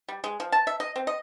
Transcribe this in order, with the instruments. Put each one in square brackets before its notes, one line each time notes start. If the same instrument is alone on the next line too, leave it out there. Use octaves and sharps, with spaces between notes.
[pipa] G3
G#3
F3
A5
E5
D#5
C4
D#5